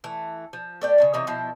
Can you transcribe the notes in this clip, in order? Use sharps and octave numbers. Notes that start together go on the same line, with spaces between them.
E3 A3
F3
A3 D5 G5
C#3 A#3 C#5
C3 E3 D#4 C#5
B2 F3 E4